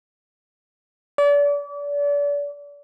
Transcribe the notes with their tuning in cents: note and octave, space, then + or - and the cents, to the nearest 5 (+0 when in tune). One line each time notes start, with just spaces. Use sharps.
D5 -35